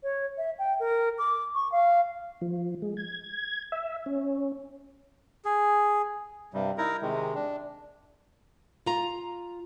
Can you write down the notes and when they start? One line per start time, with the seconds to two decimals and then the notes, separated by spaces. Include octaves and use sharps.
0.03 C#5
0.38 E5
0.59 G5
0.80 A#4
1.18 D6
1.55 C#6
1.72 F5
2.41 F3
2.82 G#3
2.97 G#6
3.72 E5
4.06 C#4
5.45 G#4
6.53 G2 C3 G3
6.78 D#4 E4 A#4 A#5
7.02 C3 D#3 G#3
7.34 D4
8.86 F4 A#5